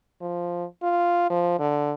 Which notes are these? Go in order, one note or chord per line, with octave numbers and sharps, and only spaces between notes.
F3
F4
F3
D3